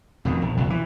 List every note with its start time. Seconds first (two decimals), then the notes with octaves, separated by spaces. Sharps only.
0.25 F2 B2 D#3
0.42 A#1
0.57 C2 F2 B2
0.70 E3